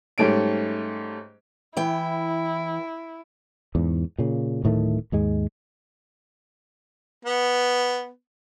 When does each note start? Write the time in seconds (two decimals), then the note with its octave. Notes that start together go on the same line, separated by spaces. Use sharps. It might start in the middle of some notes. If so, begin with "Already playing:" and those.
0.18 G#2 G3 A3 C#4 D7
1.77 E3 E4 G5
3.75 E2 G#2
4.19 A#2 C#3
4.64 D1 A2 D#3 A3
5.12 D#2 G#2 G#3
7.25 B3